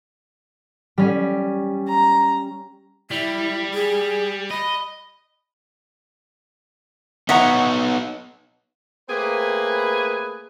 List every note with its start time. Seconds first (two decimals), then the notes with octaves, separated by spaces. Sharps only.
0.98 G3 C#4
1.88 A#5
3.11 G3 E4
3.74 G#4
4.51 D#5 B5
7.29 B3 D#4 C#5 D#5 E5 F#5 A#5
9.09 A3 A#3 C4 G#4 B4